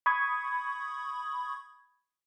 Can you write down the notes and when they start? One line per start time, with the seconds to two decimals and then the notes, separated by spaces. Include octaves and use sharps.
0.06 B5 C#6 D#6 G#6